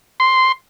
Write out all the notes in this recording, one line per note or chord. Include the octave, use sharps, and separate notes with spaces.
C6